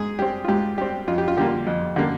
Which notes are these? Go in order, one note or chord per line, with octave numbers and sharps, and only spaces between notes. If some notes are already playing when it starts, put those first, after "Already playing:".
Already playing: G#2 G#4
G3 C4 G4
F4
G#2 G4
G3 C4 G4
F2 F4
G4
F4
D3 G3 A#3 G4
F4
F2
D3 G3 A#3